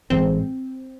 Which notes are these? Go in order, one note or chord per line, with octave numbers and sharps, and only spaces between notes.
A1 G#2 G#3 C4